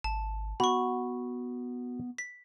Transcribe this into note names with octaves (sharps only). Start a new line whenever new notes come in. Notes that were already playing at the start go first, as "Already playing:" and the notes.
G#1 A5
B3 F#4 B5 C#6
B6